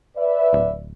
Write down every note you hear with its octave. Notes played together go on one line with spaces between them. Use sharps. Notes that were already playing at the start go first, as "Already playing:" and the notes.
B4 D5 E5
D1